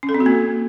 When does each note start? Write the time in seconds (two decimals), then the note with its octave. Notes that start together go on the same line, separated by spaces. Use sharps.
0.03 C#4
0.09 A4
0.14 C4
0.20 F#4
0.26 A#3